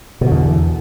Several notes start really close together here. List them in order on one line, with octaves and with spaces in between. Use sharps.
B2 D3 E2